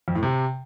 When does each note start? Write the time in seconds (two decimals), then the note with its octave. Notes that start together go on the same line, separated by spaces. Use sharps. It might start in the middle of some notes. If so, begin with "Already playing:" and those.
0.08 F2
0.15 A2
0.23 C3